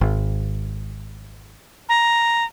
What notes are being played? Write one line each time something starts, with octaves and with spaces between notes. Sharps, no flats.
G#1
A#5